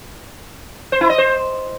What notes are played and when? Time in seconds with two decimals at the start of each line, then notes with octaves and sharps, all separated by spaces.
0.92 C5
1.01 E4
1.10 D#5
1.18 C5